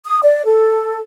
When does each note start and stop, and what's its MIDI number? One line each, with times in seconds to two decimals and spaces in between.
0.05 0.19 87
0.23 0.45 74
0.45 0.99 69